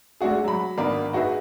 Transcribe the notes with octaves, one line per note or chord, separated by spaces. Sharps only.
G#3 A3 D4 F#4 G#4
F#3 B5
G#1 A#3 B3 D4 B5
D#4 F#4 G#4 B4 E5